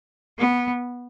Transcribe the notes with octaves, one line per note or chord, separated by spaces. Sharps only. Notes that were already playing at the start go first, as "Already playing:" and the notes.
B3